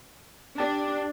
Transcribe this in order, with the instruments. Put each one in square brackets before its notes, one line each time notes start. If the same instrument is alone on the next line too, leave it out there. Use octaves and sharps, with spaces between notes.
[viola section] D4 [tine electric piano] G4 A5